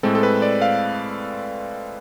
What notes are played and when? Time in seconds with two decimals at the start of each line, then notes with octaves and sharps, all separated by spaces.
0.03 A2 G#3 C4 A4
0.15 A4
0.23 B4
0.42 D5
0.62 F5